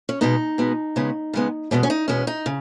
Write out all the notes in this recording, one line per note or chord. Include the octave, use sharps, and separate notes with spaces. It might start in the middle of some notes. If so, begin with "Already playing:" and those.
C#4
B2 G#3 B3 D#4
B2 G#3 B3
C#3 G#3 B3
C#3 G#3 B3
E2 B2 G#3 B3 C#4
C#4
D#4
E2 B2 G#3 B3 C#4
D#4
C#3